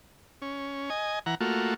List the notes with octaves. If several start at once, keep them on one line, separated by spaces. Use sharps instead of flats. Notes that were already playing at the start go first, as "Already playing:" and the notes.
C#4
D#5 G#5
E3 F#5 A#5
A3 A#3 F4 F#4